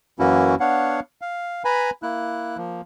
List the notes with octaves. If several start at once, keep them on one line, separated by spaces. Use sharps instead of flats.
F#2 E3 A#3 C#4 E4 F#4
B3 D4 C#5 F5 F#5
F5
B4 G#5 A#5 B5
A#3 E4 F#6
F3 A#3